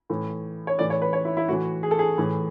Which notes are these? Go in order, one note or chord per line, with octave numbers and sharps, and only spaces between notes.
A2 E3
C#5
A2 E3 D5
C#5
B4
C#5
E4
E4
A2 E3 F#4
G#4
A4
G#4
A2 E3